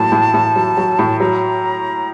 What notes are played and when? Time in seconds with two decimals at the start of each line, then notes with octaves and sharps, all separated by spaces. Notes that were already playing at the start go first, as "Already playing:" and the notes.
Already playing: A2 F#3 A#3 A5
0.12 A2
0.34 A2
0.56 F#3
0.77 F#3
0.99 A2
1.20 F#3 A#5